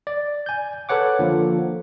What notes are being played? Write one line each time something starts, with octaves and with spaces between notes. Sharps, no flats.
D5
G#5 G6
A4 B4 C#5 F#5 D6
D3 F3 A#3